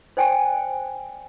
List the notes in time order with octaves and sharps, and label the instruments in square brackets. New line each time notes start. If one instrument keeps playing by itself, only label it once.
[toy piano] C5 D5 G5 G#5